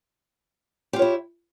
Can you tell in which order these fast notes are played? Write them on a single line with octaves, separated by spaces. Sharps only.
G4 F4 C#5 E4